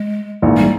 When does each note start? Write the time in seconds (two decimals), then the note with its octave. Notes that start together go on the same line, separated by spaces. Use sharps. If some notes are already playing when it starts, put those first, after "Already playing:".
Already playing: G#3
0.42 A#1 G#2 E3
0.57 G3